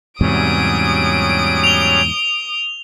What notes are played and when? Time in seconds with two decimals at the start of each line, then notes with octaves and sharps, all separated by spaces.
0.21 E2 G#2 C3 F#3 G3 C#4 D#6 D7
1.64 F7 G7